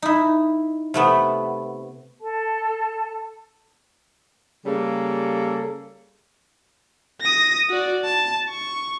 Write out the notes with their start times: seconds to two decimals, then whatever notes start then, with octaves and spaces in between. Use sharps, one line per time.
0.02 D#4 E4
0.94 C3 A3 B3
2.21 A4 A5
4.65 C#3 G3 A#3 G#4 A4
7.21 D#6 A#6
7.69 F#4 D5
8.05 A5
8.49 C#6